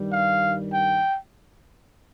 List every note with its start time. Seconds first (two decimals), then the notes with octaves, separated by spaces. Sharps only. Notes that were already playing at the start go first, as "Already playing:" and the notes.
Already playing: G2 D#3 G3
0.11 F5
0.73 G5